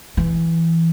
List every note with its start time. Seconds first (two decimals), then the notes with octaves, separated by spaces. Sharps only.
0.17 E3